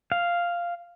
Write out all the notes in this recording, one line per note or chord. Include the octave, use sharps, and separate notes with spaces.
F5